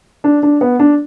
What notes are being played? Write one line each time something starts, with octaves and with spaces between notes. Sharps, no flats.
D4
D4
B3
D4